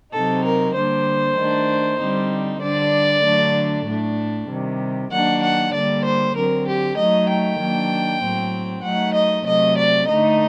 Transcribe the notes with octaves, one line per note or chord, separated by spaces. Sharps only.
C3 F#3 C4 D#4 A4
A#4
D3 G3 A#3 D4 C5
D#3 A3 D4
D3 G3 C4 D#4
D3 G3 D4 D5
D3 F#3 A3 D4
A2 A3 D4
C3 D#3 G3
D#3 F#3 A#3 D4 F#5
F#5
D3 G3 A#3 D5
C5
D3 F#3 C4 A#4
G4
F#3 A3 D#4 D#5
G5
D#3 F#3 A#3 D4
A2 F#3 C4
F#3 A3 D#4 F#5
D#5
C3 F#3 A3 D#5
D5
D3 A3 D#4 D#5